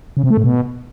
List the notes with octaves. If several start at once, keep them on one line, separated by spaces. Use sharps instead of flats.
C#3
C3
A3
A2
B2